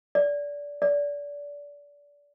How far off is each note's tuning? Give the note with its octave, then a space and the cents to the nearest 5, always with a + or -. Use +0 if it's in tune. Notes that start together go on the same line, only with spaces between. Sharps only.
D5 -20
D5 -25